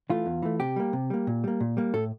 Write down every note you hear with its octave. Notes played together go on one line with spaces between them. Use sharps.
E3 A3 F4
E2
E3 A3
C3 G4
G3 A#3
C3
G3 A#3
A#2
G3 A#3
A#2
G3 A#3
A2 A4